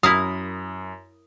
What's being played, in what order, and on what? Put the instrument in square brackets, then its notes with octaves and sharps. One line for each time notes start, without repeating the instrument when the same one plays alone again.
[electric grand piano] F#2 [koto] E4 A#4 F5 [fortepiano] D#6